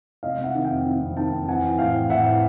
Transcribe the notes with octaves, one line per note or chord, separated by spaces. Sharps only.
C3 D#5 F5
C3
E5 F#5
D#3
F5 G5
F2
D#3
F2
D#3 G5 A5
F2
E3 F#5 G#5
E3
A2 F5 G5
E3
A2 E5 F#5
E3